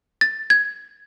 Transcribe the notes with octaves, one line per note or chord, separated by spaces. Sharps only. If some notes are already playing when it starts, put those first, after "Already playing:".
A6
G#6